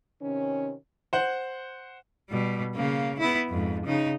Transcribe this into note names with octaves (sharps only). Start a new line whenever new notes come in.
C3 D#3 C#4
C5 F#5
B2 G3
C#3 A#3
B3 E4
F2 G#2
C#3 D#4